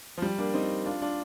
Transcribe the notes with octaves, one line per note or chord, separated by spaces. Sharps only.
F3
G3
A#3 D4
C4 D#4
D4 F4
D4 F4